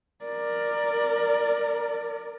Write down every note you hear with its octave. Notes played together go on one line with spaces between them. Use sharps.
A#4 D5